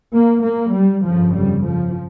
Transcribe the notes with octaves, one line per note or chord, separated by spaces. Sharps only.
A#3
A#3
G3
G1 F2 C#3 F3
G3
F3